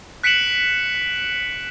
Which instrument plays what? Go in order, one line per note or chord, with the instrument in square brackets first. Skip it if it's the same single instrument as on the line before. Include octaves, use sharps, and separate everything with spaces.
[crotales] F#6 B6 C#7 D7 E7 F#7